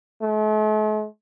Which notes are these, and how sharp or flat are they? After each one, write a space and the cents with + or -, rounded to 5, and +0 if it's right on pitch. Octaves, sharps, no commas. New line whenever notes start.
A3 -45